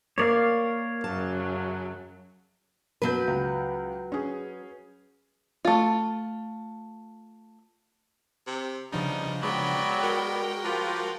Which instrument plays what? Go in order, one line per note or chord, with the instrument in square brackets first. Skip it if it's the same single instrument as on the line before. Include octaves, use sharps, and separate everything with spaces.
[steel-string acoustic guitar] A#3 A#4 [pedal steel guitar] C#5 D5 F5
[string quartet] F#2 C#3 F#3 [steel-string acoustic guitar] A5
[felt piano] F#2 B2 G6 [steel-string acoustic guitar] F#3 B4
[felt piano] C#2
C#4 G#4
[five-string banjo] A3 F4
[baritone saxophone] C3 [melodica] G5
[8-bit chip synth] C#3 F3 D4 [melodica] G3 B3 [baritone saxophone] D#4
[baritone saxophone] F#3 [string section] G#3 G5 [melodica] B3 D5 B5
[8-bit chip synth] F#4 A#4
[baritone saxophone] F3 [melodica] F4 G4 B4